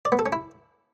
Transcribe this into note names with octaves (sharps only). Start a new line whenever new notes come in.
D5
B3
A4
C#4
E4